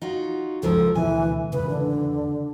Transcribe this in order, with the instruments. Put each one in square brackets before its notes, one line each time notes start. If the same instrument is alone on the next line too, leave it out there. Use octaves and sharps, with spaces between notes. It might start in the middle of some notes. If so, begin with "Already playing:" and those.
[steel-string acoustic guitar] D#4 F4 F#4
[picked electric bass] C#2 C#3 [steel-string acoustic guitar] G#2 F3 A#4 [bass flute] A4
[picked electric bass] D2 B2 [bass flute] E3 [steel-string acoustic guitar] G#5
[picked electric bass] G#1 E2 C#3 [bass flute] B4
[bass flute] D3